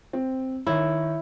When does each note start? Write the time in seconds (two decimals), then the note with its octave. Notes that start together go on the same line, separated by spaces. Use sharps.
0.13 C4
0.67 D#3 E4 C#5